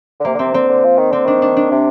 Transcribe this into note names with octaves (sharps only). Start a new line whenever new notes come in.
D3
C3 A#3
D3
C3 C4
D3 C4
D3
F3
D#3
D3 C4
D#3 D4
D4
D4
C3